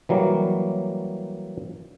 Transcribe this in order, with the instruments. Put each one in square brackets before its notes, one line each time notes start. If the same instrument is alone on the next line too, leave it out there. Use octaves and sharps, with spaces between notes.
[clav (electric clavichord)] E3 F#3 G3 A#3